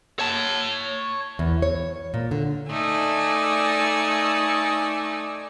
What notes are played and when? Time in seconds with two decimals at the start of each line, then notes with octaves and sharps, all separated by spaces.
0.19 C#5 A5
1.39 E2
1.62 C#5
2.14 A#2
2.31 D3
2.70 A3 D#4 D5 G#5 E6